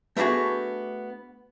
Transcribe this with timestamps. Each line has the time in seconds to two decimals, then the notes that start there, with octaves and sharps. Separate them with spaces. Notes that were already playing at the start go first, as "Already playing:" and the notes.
0.17 A3 B3 D4 F#4 G#4